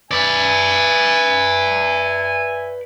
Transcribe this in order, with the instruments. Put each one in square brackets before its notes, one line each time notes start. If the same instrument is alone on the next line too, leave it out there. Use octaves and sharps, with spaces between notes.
[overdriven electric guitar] B4 D5 [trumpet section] E5 G#5